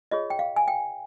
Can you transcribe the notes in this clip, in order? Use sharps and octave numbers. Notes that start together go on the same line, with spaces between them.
F4 G#4 C#5 D#5
G5
F5
G#5
G5